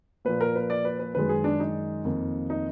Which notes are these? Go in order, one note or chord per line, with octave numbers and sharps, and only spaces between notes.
A#2 F3 A#3 B4
A#4
B4
D5
B4
B4
F#2 D#3 G#3 B4
G#4
D4
D#4
F2 D#3 A#3
D#4